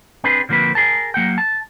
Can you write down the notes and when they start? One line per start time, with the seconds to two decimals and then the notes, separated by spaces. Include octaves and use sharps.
0.24 C4 D4 G#4 B4
0.49 D3 F3 A#3 C4 B4
0.75 G#4 A#4 A5
1.14 F#3 A#3 F#5 G5
1.38 A5